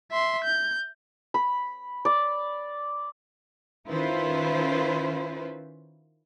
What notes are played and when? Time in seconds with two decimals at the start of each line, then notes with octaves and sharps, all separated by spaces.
0.11 E5 C6
0.44 G6
1.34 B5
2.05 D5
3.88 D#3 C#4 E4 F4 B4 C5